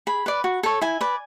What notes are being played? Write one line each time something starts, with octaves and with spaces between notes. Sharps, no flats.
G#4 B5
B4 D5
F#4
A4 C#5
E4 G#5
B4 D5